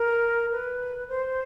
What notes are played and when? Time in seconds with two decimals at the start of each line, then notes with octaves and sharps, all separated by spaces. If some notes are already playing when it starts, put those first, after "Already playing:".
Already playing: A#4
0.51 B4
1.08 C5